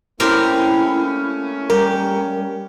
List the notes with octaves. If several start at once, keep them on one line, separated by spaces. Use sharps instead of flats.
A3 A#3 C4 C#4 E4 G4 A#4
G3 G4 A#4